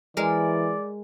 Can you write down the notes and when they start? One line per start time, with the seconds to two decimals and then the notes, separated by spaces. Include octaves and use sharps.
0.17 E3 G#3 A#4 D5